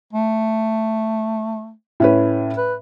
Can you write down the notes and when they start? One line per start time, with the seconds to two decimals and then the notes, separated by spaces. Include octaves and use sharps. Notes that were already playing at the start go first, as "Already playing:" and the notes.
0.13 A3
2.00 A2 C#4 B4
2.57 B4